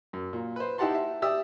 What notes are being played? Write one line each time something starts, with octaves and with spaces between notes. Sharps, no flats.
F#2
A#2
B4 C5
D#4 E4 G4 F#5 A5 C6
E5
G4 D5 E5 D#6 E6